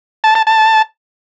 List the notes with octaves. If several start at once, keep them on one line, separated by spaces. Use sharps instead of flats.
A5
A5
A5